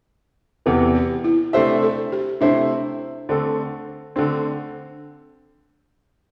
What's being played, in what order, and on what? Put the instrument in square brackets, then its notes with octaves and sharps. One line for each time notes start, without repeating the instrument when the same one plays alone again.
[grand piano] E2 C3 E3 [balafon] A4
[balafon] G4
E4
[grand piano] C3 A3 D4 C5 E5 [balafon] G4
[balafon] A4
G4
[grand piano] C3 A3 E4 C5 [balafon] D4
[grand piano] D3 A3 C4 A4
[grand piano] D3 A3 C4 [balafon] D4